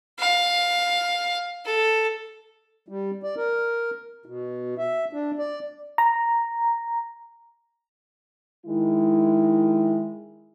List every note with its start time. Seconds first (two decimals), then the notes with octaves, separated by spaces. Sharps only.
0.19 F5
1.65 A4
2.88 G3
3.23 D5
3.37 A#4
4.26 B2
4.78 E5
5.13 D4
5.39 D5
5.98 A#5
8.66 D#3 G#3 E4